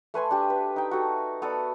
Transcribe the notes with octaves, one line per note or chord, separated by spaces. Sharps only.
A3 B4 G#5 C6
D4 G4
B4
D#4 G5
F#4 A4
B3 A4 D5